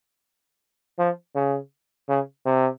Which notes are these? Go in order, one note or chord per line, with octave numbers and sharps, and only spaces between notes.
F3
C#3
C#3
C3